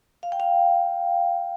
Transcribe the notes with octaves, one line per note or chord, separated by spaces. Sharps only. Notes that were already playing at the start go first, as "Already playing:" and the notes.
F5
G5
F5